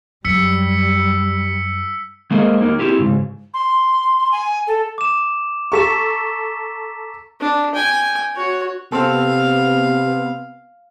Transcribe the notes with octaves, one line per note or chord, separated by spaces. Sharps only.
F#2 G3 E6 B6 C#7
G#3 A#3 G#4 A#4 C5 D#5
A#3 D#4 A#4
C4 E4 G4 G#4
G#2 C#3
C6
G#5
A4
D6 E7
A4 A#5 C#6 B6 E7
D4
G5 G#5
F#4 C#5
C3 B3 C4 A4 F5